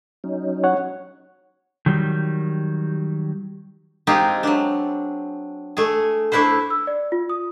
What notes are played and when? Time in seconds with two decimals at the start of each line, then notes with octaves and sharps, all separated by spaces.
0.24 F#3 C#4 D#4
0.64 C#5 F#5
1.86 D#3 F#3 G3
4.07 G#3 C4 D#4 F4 G4 G#4
4.43 F#3 D4
5.77 A3 G#4
6.32 A3 D4 E4 B4 C5
6.70 E6
6.87 D5
7.12 F4
7.29 D#6